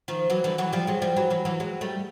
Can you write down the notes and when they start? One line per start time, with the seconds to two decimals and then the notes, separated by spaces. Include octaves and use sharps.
0.08 D#3 F3
0.30 E3 F#3
0.44 D3 E3
0.58 E3 F#3
0.73 F3 G3
0.87 F#3 G#3
1.02 F3 G3
1.16 E3 F#3
1.30 E3 F#3
1.45 E3 F#3
1.60 F#3 G#3
1.81 G3 A3